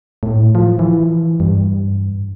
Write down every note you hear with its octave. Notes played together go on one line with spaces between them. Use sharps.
A2
F3
E3
G2